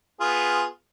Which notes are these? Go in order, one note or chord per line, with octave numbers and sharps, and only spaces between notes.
B3 F4 G#4